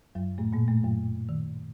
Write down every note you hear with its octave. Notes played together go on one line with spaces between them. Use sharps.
F#2 F#3
A2 A3
A#2 A#3
A2 A3
F#2 F#3
D#3